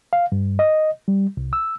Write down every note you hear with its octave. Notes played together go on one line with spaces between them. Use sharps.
F5
G2
D#5
G3
C2
E6